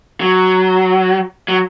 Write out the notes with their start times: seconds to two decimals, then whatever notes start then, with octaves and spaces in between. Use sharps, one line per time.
0.21 F#3
1.48 F#3